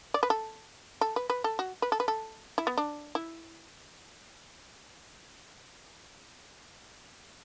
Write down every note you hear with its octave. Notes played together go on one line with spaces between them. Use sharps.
D5
B4
A4
A4
B4
B4
A4
F#4
B4
A4
B4
A4
E4
B3
D4
E4